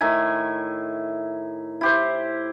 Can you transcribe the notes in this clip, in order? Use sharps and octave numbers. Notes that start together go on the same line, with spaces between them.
A2 D#3 E5 G#5
E4 G4 C5